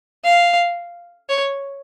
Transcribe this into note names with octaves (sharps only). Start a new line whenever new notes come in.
F5
C#5